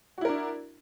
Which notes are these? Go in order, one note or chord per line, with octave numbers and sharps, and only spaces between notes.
D4 E4 F#4 A#4